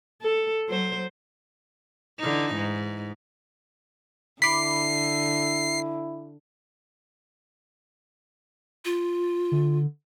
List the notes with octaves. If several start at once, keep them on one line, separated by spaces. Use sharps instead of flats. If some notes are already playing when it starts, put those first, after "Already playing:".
A4
F#3 C5
D3 E3 D#4
G#2
D3 E4 B5 D6 C7
F4
D3